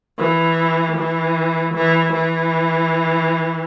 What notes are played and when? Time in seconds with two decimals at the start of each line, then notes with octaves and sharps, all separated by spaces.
0.19 E3
0.96 E3
1.74 E3
2.13 E3